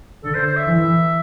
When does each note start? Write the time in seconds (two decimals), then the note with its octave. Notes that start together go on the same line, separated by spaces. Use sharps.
0.25 D3 A4
0.35 C5
0.46 C5
0.57 E5
0.67 E3